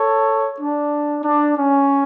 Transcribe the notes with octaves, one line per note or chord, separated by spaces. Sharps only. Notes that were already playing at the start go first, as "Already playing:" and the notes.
Already playing: A4 C#5
D4
D4
C#4